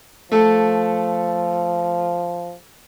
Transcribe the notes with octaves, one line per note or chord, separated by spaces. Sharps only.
F3 A3 A4